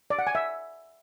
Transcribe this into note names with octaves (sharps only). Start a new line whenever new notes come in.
D5
F#5
G#5
E5